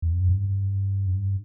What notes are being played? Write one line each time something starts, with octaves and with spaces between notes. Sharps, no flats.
E2
F2
F#2
G2
F#2
G2